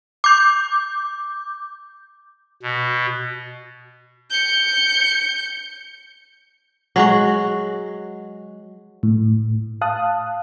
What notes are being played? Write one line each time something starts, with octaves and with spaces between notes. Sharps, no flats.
D6 G6
B2
G6 C#7
F#3 G#3 F#4
A2
F5 A5 D#6 F#6